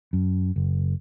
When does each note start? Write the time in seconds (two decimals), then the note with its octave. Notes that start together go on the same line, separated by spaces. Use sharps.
0.13 F#2
0.56 F#1